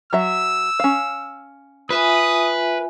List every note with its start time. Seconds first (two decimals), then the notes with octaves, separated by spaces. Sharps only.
0.13 F#3 E5 E6
0.80 C#4 F5
1.90 F4 B4 E5 G#5 D#6